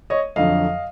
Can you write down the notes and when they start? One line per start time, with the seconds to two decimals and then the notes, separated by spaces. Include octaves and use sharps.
0.10 C#5 D#5
0.36 F2 D3 F#3 D#5 F5